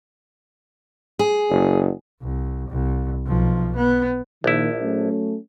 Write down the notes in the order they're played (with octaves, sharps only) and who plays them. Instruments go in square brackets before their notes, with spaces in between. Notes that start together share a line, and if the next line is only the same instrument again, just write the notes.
[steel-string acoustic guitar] G#4
[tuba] F#1
[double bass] C2
C2
B1 F3
B3
[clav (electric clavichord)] A#1 E4 [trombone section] A#2 D#3
[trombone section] F#3 A3 C#4